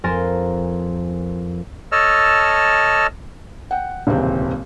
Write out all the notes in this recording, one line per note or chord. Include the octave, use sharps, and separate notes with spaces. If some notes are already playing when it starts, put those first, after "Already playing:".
F2 A#4 G#5 C6 A6 E7
A4 C#5 D#5 A5 E6 F6
F#5 G5
D#1 C#2 C3 E3 C4